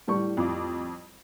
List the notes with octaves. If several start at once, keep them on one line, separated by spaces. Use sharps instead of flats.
A2 G3 C#6
F2 D6